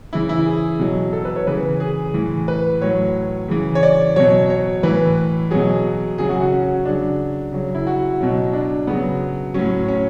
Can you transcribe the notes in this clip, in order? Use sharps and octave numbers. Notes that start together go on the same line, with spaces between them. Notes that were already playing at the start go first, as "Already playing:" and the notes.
C#3 E3 E4
E4
G#4
B2 F#3
A4
B4
C#5
C#3 E3 B4
G#4
A2 E3
B4
A2 F#3 C#5
C#3 E3
C#5
D5
B2 F#3 C#5
C#5
A2 E3 B4
B2 F#3 G#4
C#3 F#3 G#4
F#4
F#4
C#4
C#3 F#3 D4
C#3 F#3
E4
F#4
B2 F#3
D4
C#3 F#3 B3
A2 F#3 C#4
C#4